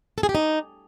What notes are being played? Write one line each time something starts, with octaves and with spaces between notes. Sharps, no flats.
A4
G#4
G4
D#4